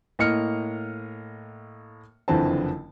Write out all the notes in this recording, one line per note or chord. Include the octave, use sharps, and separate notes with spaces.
A2 A#3 D#5 F6 C#7
F#1 F2 D3 E3 C4 A5